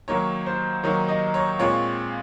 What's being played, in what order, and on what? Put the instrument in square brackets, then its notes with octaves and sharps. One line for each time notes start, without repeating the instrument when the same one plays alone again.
[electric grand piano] D#3 F#3 A#3 D#4 [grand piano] C#5
[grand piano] C5
[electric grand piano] D#3 F#3 A#3 D#4 [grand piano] C#5
[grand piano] D#5
C#5
[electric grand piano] A#2 G#3 C4 F4 [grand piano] C#5